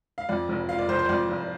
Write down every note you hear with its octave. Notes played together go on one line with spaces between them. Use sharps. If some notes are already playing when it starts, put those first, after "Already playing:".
F5
F2 D5
F1
F3 F5
D5
F1 C5
C5
F2 D5
F1